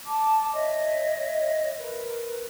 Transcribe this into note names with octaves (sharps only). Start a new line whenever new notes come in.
A5 D6
C#5 D#5 E5
A#4 B4